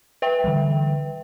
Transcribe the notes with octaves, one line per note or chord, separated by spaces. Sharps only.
B4 E5 G5
D3 E3 G3